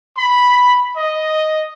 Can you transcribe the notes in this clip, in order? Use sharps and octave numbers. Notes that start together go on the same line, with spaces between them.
B5
D#5